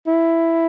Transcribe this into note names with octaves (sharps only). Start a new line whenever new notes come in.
E4